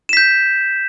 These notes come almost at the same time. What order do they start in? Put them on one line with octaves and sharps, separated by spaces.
E7 B6 G6